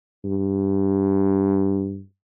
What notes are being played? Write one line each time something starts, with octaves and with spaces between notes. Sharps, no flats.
G2